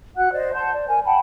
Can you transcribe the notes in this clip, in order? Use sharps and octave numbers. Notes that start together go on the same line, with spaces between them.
F#4 F#5 F#6
C5 D5 D#5
F#5 A5 C6 G6
D5
A#4 G#5
F#5 G5 A5 B5